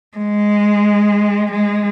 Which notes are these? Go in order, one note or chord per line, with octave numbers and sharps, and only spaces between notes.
G#3
G#3